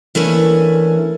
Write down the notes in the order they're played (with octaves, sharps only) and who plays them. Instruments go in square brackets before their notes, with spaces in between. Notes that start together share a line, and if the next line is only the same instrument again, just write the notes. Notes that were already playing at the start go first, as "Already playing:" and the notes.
[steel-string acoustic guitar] E3 A3 A#3 C#4 D4